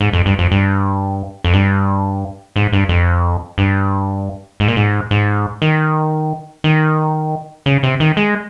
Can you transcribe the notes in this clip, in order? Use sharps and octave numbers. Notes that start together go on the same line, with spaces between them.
G#2
F2
G2
F2
G2
F2
G2
G#2
G2
F2
G2
G#2
A#2
G#2
G#2
D#3
D#3
C#3
C3
D#3
G#3